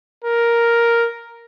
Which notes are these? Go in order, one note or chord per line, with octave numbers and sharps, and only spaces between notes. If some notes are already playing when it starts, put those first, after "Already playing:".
A#4